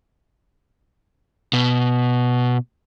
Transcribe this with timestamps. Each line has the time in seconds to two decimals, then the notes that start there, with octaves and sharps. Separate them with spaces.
1.53 B2